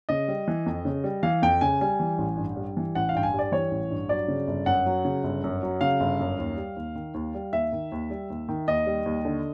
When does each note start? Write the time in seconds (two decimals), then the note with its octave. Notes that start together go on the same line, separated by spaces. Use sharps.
0.09 C#3 D#5
0.28 G3
0.48 E3
0.66 F2
0.85 C#3
1.04 G3
1.23 E3 F5
1.42 F2 G5
1.61 C#3 G#5
1.81 G3 G#5
2.00 E3
2.18 A1
2.37 G2
2.56 G3
2.77 E3
2.95 A1 F#5
3.09 F5
3.15 G2 G5
3.23 G#5
3.34 G3
3.39 D5
3.52 E3 C#5
3.71 A1
3.91 G2
4.09 F#3 D5
4.28 C#3
4.47 G1
4.66 F#2 F#5
4.86 F#3
5.05 C#3
5.23 G1
5.44 F#2
5.63 F#3
5.81 C#3 F5
6.00 G1
6.20 F#2
6.39 D#2
6.57 G3
6.76 D#2
6.95 D#3
7.14 D#2
7.35 G3
7.52 D#2 E5
7.72 D#3
7.92 D#2
8.10 G3
8.30 D#2
8.49 D#3
8.68 D#2 D#5
8.86 G3
9.06 D#2
9.25 D3